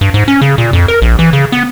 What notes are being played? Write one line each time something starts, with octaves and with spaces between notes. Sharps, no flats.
G2
G#2
C#4
C#3
A#2
F2
A#4
A#1
E3
C#3
B3